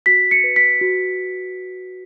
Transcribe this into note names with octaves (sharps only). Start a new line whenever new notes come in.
F#4 B6
C#7
B4
B6
F#4